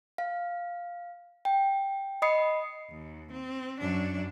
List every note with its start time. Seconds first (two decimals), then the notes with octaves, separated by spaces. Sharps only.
0.18 F5
1.45 G5
2.22 D#5 B5 D#6 C7 C#7
2.91 D#2
3.32 C4
3.81 F#2 D4